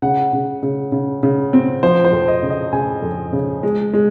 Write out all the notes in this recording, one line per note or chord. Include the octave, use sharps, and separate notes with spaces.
C#3 F#5
C#3
C#3
C#3
C#3
C4
F3 C5
C5
F2
D#5
C#3
D#5
C#3 G#5
F2
C#3
G#3
G#3